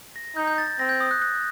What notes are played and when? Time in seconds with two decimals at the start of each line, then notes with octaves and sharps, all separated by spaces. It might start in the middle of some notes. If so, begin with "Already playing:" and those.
0.16 A#6
0.36 D#4 G6
0.47 G6
0.58 A6
0.79 C4 A#6
0.89 G6
1.01 D#6
1.11 F#6
1.22 F#6